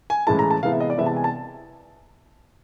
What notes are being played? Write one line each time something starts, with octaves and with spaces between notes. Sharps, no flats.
G#5
A2 E3 G#3 C#4 E4 A5
A#5
A5
C3 E3 G#3 B3 E4 F5
E5
D#5
D5
C3 E3 G#3 B3 E4 E5
A5
G#5
A5